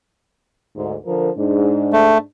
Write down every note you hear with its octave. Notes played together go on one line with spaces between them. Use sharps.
D2 G#2
D3 F3 A#4
G#2 D4
A3